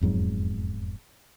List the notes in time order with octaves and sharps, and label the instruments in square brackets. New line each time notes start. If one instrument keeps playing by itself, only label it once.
[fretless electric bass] E1 F2 G#2 F#3